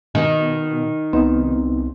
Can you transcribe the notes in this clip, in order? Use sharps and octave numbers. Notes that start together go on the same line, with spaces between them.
B2 D#3
C2 B3 C4 D#4